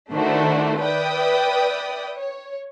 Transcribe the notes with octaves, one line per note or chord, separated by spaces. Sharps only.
D#3 A3 D4 E4 F#4 C5
B4 D5 E5 G5 D#6
C#5